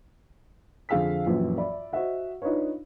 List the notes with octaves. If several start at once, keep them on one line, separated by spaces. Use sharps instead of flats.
F2 D3 G#4 F5 E6 B6
A#1 F#2 E3 F3
D5 E5 B5
F#4 C5 D#5 E5 F#5
D4 D#4 F4 B4 C#5